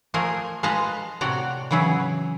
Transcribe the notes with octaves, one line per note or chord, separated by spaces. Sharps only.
F3 A3 G#4 A#4
G#3 F4 B4 D#5 A5 A#5
A2 C3 F#4 D5 A#5
C#3 E3 F#3 E4 G#4